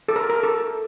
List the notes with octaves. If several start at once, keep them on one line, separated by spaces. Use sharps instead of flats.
A4
A#4
A#4
A4